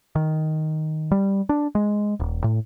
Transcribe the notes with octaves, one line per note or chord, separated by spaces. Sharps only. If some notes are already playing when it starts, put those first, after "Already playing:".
D#3
G3
D4
G#3
D#1
A2